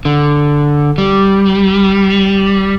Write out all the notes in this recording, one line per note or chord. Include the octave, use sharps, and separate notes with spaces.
D3
G3